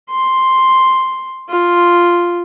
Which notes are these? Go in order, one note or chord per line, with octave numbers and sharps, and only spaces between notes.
C6
F4